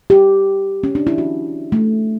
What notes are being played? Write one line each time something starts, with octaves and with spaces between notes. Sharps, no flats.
G4
C#4
D4
E4
F#4
A3